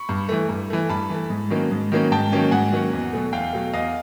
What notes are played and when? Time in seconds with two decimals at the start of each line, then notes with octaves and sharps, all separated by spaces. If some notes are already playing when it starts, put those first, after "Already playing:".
Already playing: B5 C#6
0.09 G2
0.29 E3 A3
0.49 G2
0.70 E3 A3
0.89 G2 A5 B5
1.10 E3 A3
1.30 G#2
1.50 D#3 F#3 A#3 C#4
1.71 G#2
1.92 D#3 F#3 A#3 C#4
2.12 G#2 G5 A5
2.32 D#3 F#3 A#3 C#4
2.51 G#2 F#5 G#5
2.72 D#3 F#3 A#3 C#4
2.93 E2
3.13 B2 F#3 A3
3.33 E2 F5 G5
3.53 B2 F#3 A3
3.73 E2 D#5 F5